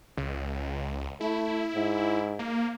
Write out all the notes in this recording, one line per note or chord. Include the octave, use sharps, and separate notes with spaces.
C#2
A3 E4
G#2
A#3